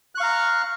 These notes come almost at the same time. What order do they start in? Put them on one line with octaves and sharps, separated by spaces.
F#6 C#6 F5 A#5 F6